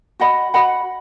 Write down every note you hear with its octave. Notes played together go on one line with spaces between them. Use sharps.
F#4 D#5 F#5 B5
F#4 D#5 F#5 B5